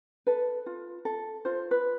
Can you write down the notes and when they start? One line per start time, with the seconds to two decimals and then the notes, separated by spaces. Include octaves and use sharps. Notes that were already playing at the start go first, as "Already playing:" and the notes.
0.27 A4 B4
0.66 F4
1.05 A4
1.45 F4 C5
1.71 B4